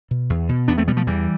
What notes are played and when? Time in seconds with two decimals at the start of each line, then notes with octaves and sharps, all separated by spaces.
0.11 B2
0.30 E2
0.49 B2
0.68 E2 B3 D4
0.78 A3 C4
0.88 B2 G3 B3
0.97 F3 A3
1.07 E2 E3 G3